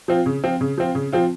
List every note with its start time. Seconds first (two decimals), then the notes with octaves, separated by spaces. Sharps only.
0.08 F3 C4 F4
0.26 C#3
0.44 F3 C4 F4
0.61 C#3
0.78 F3 C4 F4
0.95 C#3
1.12 F3 C4 F4